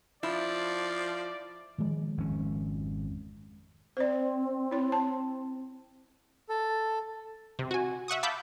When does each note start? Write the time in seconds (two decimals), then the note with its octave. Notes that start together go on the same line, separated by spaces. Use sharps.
0.23 F3 E4 D5
1.78 D#3 F3 G#3
2.18 G#1 F2 C#4
3.97 C4 C5 D5
4.71 E4 C#5
4.92 A5
6.49 A4
7.59 C3
7.71 F#4 G#5
8.08 E5 F#5 C#6 D#6
8.23 F5 A5 B5 D6 E6 G6